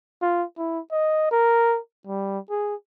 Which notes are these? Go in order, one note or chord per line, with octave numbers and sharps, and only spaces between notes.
F4
E4
D#5
A#4
G3
G#4